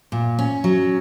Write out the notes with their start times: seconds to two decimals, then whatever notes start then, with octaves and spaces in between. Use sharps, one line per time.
0.12 A#2
0.39 C#4
0.64 F#3